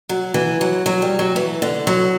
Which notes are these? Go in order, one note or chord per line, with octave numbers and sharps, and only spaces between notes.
F#3
E3
F#3
F#3
G3
F#3
E3
D3
F#3